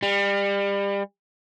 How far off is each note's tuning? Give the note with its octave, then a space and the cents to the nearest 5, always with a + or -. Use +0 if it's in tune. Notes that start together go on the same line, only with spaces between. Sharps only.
G3 +30